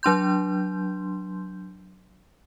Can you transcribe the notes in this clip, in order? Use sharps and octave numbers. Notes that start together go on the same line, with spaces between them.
F#3 D4 C6 G6